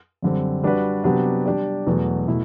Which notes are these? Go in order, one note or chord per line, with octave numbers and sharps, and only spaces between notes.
F#2 D3 G3 C4
G3 D4 F#4 B4 D5
C3 F#3 B3 D4 G4
G3 D4 G4 D5
E2 B2 F#3 A3
B2 A3 E4